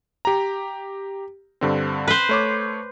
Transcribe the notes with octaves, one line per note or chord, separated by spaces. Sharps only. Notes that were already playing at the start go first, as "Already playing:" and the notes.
G4 A#5
G2 D3 C4
B4 C5
A3 C#5 D6